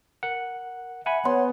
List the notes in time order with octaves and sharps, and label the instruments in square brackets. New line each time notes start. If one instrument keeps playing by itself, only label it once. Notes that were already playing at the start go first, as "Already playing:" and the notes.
[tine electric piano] A#4 F#5
[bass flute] E5 [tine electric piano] F#5 G#5 B5
[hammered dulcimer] B3 C6 [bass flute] C#5